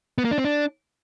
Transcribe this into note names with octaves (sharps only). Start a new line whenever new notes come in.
B3
A#3
D4
C4
D4